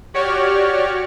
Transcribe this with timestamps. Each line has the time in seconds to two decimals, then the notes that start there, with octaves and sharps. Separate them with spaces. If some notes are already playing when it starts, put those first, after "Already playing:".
0.14 F#4 G4 C#5 D5 C#6 F6